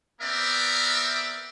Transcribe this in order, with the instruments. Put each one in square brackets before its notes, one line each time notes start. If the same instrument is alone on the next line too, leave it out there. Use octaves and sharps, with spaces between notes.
[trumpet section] B3 C4 A#4 D5 E5